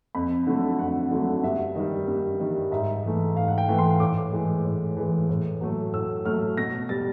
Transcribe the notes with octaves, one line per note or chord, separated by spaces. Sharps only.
F2 B5
D3 F#3 A3
F2 F#5
D3 F#3 A3 F#5
G2 E5
D#3 G3 D#5
G2
D#3 G3
G#2 E5
E3 A3
G#2 F5
F#5
G5
E3 A3
C6
A2 D6
E3 G#3
A2
E3 G#3
A2
F#3 A3
A2 E6
F#3 A3 F6
B2 A#6
G3 A6